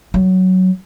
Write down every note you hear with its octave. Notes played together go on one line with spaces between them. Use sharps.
F#3